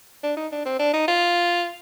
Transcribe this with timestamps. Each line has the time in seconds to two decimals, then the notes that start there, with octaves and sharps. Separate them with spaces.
0.23 D4
0.37 D#4
0.52 D4
0.65 C4
0.79 D4
0.93 D#4
1.08 F4